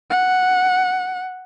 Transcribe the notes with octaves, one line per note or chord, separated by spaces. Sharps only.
F#5